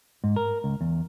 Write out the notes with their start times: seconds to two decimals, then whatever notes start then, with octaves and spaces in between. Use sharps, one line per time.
0.24 G#2
0.36 A#4
0.64 C#2
0.81 E2